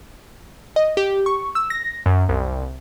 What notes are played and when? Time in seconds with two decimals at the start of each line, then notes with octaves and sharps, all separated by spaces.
0.76 D#5
0.97 G4
1.26 C#6
1.55 E6
1.70 A#6
2.06 F#2
2.28 C2